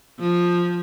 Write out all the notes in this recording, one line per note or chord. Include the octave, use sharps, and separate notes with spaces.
F3